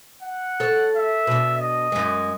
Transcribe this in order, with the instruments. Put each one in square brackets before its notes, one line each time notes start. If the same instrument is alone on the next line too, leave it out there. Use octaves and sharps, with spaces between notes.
[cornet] F#5
[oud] A4 C#5
[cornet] E5
[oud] B2 D4
[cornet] D#5
[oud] F#2 G#3